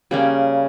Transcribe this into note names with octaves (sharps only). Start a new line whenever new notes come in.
C#3 G3 A#3 C#4